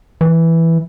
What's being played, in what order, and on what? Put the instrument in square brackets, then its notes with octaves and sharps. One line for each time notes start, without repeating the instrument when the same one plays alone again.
[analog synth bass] E3